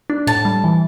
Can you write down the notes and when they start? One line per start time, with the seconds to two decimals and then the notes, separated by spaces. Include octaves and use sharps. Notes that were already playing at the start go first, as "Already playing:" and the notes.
0.10 D4
0.27 A2 A5
0.45 G3
0.64 E3